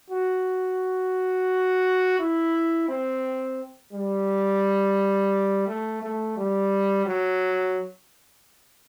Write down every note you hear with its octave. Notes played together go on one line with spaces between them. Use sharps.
F#4
E4
C4
G3
A3
A3
G3
F#3